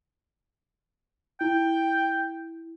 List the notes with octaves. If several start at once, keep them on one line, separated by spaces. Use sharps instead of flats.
E4 G5